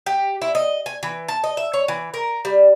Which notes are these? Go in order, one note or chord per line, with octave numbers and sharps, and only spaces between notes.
G4
E4
D#5
G#5
E3
A5
D#5
E5
C#5
E3
A#4
G3